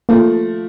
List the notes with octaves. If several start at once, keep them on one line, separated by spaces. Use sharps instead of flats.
F3 A3 A#3